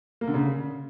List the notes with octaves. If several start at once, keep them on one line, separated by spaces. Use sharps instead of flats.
A#3
D3
C#3